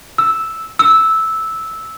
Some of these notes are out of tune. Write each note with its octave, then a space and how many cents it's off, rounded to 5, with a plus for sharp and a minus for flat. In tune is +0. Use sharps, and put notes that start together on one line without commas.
E6 -5
E6 -10